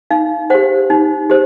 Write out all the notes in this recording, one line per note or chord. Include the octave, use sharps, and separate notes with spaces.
D#4 F5
G4 C5 F#5
D#4
G4 C5